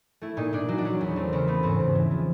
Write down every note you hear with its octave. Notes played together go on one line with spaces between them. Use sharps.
A3 E4
A#2 D#4
A#2 D4
F#3
D4
F#3 C#4
E2
A3 C4
C#3 C4
A3 B3
G#2 C4
G#2
E3
F3